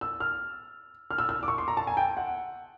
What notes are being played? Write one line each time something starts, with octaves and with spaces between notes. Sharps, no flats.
E6
F6
F6
E6
E6
D6
C#6
C6
A#5
A5
G#5
G5
F#5